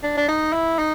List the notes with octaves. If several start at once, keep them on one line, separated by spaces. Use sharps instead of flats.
D4
D4
D#4
E4
D#4